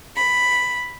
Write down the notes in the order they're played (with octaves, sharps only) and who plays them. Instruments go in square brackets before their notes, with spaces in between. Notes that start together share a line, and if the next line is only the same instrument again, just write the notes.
[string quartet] B5